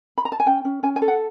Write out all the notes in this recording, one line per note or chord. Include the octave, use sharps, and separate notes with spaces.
B5
A#5
A5
G#5
C#4 G5
C#4
C#4 G#5
G#5
A4
F#5